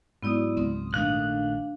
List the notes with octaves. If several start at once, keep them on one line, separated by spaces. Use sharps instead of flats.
G#2 F#3 B3 E4 D5 D#6
C#2 C4
A#1 D#3 A3 D4 F5 F#6